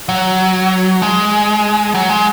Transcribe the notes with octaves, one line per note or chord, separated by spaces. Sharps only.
F#3
G#3
F#3
G#3